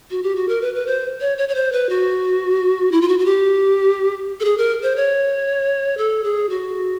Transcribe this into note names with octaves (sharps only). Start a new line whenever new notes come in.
F#4
G4
F#4
A#4
B4
B4
C5
C#5
C#5
C#5
C5
B4
F#4
E4
F4
F#4
F#4
G4
A4
G#4
A#4
C5
C#5
A4
G#4
F#4